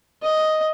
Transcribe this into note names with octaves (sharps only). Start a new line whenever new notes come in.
D#5